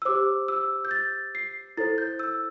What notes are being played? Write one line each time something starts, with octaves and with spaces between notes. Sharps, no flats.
E6
G4 C5 D6
E6
G6
A6
C7
E4 A4 C5 A6
G6
E6